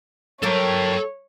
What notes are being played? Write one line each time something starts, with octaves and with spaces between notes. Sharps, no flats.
F#3 A#3 A4 A#4 C#5 G5